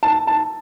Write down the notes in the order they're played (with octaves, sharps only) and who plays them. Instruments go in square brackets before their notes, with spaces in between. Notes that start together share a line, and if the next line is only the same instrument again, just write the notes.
[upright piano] A5
A5